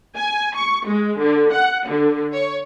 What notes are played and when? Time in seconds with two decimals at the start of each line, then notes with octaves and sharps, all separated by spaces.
0.18 G#5
0.56 C#6
0.87 G#3
1.20 D3
1.52 F#5
1.88 D3
2.33 C#5